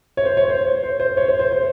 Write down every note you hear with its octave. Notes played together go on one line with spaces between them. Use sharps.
C#5
C5
C#5
C5
C5
C5
C#5
C5
C5
C5